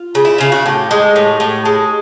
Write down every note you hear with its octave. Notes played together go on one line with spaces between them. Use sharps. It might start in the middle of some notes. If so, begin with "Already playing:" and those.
Already playing: F4
C#3
E4
C#3 F4
F#4
A2 G4
G#3
A2
A2
G#3